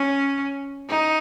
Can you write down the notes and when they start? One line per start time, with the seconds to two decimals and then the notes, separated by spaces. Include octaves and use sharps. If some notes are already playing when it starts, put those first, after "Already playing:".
Already playing: C#4
0.88 D#4